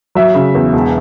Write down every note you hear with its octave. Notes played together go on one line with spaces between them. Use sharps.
F#3 E5
C#3
E2
E1